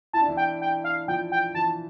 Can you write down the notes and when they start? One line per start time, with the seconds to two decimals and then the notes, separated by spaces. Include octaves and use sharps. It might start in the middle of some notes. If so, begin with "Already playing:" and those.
0.13 E4 A5
0.21 D4
0.28 E3 E4
0.37 G5
0.61 G5
0.84 F5
1.08 F3 G5
1.32 G5
1.54 E3 A5